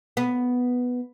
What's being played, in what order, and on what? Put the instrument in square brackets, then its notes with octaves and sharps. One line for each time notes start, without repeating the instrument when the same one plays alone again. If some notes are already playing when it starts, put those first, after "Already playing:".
[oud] B3